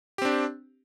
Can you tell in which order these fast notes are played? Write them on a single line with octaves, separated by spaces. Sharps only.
G4 C4 D4